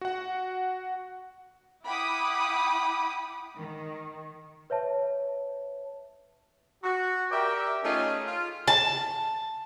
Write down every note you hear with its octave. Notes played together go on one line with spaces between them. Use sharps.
F#4 F#5
E4 F#5 G5 B5 D6 D#6
D#3
B4 C#5 E5 A5
F#4
G4 A#4 D5 E5 G5
A3 C#4 D#4 F4 G#4
F4
A5